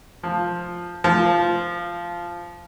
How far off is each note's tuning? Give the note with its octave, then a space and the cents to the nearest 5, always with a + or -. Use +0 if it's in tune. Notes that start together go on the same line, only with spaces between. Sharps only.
F3 +5
F3 -10